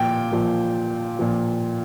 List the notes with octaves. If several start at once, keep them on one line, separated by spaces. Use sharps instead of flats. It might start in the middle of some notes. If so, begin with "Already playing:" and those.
Already playing: A#2 F3 G5
A#2 F3
A#2 F3